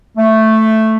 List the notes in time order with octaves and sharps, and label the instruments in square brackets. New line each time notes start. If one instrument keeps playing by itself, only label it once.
[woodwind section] A3